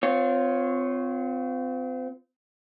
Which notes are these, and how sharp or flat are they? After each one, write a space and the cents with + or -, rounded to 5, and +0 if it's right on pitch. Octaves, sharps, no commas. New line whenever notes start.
C4 -30 F4 +10 C#5 +0